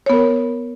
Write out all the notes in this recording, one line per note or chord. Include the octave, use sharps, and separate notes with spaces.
B3 A#4 C#5